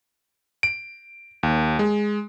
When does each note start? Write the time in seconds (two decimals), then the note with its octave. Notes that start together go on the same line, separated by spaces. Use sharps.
0.63 D7
1.43 D#2
1.79 G#3